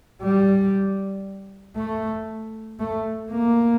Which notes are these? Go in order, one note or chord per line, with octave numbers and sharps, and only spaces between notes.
G3
A3
A3
A#3